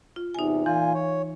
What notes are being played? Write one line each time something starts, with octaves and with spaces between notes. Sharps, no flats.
F4
E2 C3 D#4 G#5
A#2 E3 F4 G#5
C#5